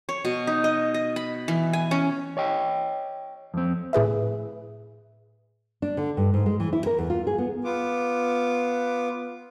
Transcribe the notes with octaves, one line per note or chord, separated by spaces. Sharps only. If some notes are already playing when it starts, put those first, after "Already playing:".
C#5
B2
D#4
D#5
D#5
B5
E3
G#5
C#4
C#5 D#5 G5
F2 C4
A2 G#4 B4 E5
D4
D3
G2
G#2
G#3
E3
E4
A#4
E2
F4
G#4
B3
B3 F4 D6